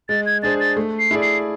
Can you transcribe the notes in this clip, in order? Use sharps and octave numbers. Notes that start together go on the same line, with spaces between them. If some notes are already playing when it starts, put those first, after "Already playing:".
G#3 A6
G#6
D4 G#4 C5 A6
A6
A3
C7
E4 G#4 D5
C7